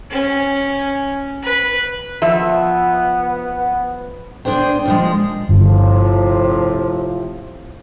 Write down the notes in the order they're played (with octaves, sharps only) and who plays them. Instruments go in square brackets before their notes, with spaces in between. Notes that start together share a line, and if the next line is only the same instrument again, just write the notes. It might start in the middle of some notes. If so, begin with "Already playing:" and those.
[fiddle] C#4
B4
[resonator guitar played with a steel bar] F3 E5 [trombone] B3
[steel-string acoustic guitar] D4 G#4 C5 G5
A#2 F3 G#3
[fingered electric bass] G1 [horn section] A2 C3 F3